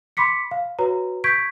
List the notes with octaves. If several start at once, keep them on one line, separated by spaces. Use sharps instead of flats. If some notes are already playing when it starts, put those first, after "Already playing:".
B5 C6 D6 B6 C#7
F5
F#4 B4 C#5 A#5
C#6 G6 G#6 B6 D7